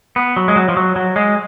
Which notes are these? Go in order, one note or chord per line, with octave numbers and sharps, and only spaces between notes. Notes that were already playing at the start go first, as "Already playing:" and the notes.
B3
F#3
G#3
F#3
F3
F#3
F#3
G#3